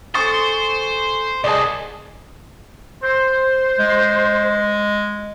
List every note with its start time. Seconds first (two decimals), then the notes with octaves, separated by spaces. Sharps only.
0.14 A4 C5 G#5 C#6 D#6 A6
1.44 C2 G#4 D5 D#5 A5
3.03 C5
3.79 G#3